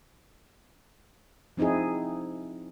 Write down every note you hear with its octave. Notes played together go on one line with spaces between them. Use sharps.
F3 C4 D#4 E4 G#4